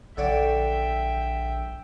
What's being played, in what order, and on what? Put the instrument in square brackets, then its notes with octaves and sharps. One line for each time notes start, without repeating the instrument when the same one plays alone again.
[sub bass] A#1 [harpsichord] D3 C#5 D5 [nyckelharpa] E5 G5